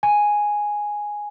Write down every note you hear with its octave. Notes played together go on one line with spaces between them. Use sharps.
G#5